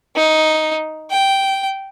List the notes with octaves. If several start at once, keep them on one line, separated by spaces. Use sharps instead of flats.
D#4
G5